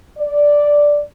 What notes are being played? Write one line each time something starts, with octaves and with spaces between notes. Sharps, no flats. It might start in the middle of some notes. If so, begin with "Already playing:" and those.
D5